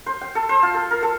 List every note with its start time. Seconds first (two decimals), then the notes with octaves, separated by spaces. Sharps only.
0.06 C5
0.21 G5
0.35 A4
0.49 C5
0.63 F4
0.74 A4
0.91 A#4
1.03 A4